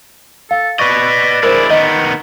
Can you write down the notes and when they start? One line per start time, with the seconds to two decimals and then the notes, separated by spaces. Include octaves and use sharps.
0.51 A4 F5
0.79 B4 D5 D#5 C#6
1.43 G#3 E4 A#4 C5
1.70 D#3 B3 D#5